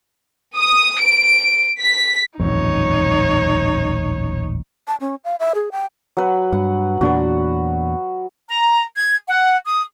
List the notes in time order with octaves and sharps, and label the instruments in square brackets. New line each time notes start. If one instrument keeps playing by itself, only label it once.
[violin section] D#6
D7
B6
[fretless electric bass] D#1 A1 F2 [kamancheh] D#4 C#5
[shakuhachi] A5
C#4
F5
E5
G#4
G5
[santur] F#3 B4
[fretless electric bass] G2 [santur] F#5
[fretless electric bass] E2 A#2 D4 [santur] F#4 B4
[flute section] A#5
G#6
F#5
D#6